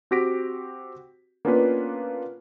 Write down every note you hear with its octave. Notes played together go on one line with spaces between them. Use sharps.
C4 F#4 G4 A#6 B6 D7
A#3 B3 C#4 D4 F4 B4